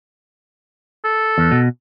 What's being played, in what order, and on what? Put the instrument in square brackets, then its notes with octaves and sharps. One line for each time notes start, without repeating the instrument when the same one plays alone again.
[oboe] A4
[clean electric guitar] E2
B2